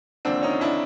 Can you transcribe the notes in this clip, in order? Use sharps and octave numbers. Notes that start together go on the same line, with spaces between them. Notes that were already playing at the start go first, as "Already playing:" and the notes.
F1 D#2 D3 F3 C4 D4
C#4 D#4
D4 E4